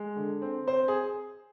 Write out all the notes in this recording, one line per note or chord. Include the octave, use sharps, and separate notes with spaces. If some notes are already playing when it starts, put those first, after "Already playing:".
Already playing: G#3
D3
C4
C4 C5
G#4